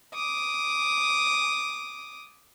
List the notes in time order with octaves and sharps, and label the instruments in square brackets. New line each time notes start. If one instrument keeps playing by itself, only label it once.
[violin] D6 D#6